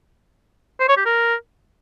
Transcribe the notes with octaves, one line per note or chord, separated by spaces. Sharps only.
C5
C#5
G4
A#4